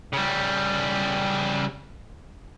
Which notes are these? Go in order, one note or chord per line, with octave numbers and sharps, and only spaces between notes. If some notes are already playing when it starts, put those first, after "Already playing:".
C#3 G3